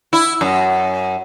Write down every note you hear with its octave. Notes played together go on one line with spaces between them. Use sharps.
E4
F#2